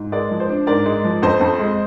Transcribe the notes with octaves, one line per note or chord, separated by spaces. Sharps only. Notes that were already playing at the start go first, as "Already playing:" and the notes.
Already playing: G#2
G#3 A#4 D5
F3
C5
D4
G#2 A#4 D5
G#3
F3
F2 C5 D#5
F2
G#3